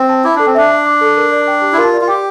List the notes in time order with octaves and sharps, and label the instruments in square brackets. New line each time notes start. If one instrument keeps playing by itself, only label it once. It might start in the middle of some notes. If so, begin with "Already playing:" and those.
Already playing: [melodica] C4
[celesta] A5
[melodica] E4 [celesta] D6
[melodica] D4 [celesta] A4
[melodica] C4
[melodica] D4 [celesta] E5
[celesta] A5
D6
A4
A#4
D5
G5
G4
[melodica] E4
[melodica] F4 [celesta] A#4
[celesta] D5
[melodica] F4
[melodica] G4 [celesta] G5